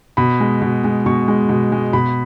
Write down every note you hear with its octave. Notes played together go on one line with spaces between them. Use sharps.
B2 B5
G#3
B2
G#3
B2 C#6
G#3
B2
G#3
B2 B5